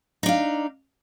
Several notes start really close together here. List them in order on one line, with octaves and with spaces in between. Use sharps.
D#4 D4 F5